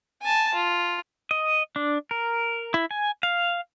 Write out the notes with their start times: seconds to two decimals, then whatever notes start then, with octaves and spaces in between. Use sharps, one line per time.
0.22 G#5 A5
0.54 F4
1.31 D#5
1.76 D4
2.11 A#4
2.74 E4
2.91 G#5
3.23 F5